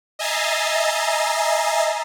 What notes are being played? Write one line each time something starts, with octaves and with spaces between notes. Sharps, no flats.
D#5 E5 G#5 A#5 A6 C7